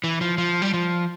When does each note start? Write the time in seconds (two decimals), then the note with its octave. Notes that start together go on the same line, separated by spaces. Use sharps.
0.04 E3
0.21 F3
0.38 F3
0.62 G3
0.74 F3